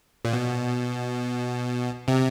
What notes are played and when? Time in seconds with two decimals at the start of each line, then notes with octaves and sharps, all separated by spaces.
0.25 A#2
0.33 B2
2.08 C3